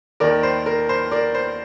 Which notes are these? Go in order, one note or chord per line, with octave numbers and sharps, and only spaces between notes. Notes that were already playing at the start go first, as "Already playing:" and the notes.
D#2 D#3 A#4 D5
C5
A#4
C5
A#4 D5
C5